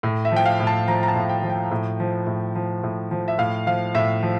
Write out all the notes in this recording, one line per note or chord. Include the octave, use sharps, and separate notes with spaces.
A2
E5
F3 G5
F5
A2
A5
F3 A#5
A#5
A5
A2
G5
F3
G5
A2
F3
A2
F3
A2
F3
E5
A2 F5
F3 F5
A2 E5
F3